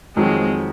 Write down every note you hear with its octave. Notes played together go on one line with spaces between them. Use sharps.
F2 D#3 F#3 G#3 C4